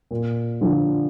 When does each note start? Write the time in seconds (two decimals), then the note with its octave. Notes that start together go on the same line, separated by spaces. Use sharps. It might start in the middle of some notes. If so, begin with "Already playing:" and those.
0.11 A#2
0.61 D3 F3